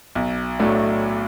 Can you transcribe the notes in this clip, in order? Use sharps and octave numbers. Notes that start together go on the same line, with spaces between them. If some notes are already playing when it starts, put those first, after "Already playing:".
B1
A2 F#3 A3 D4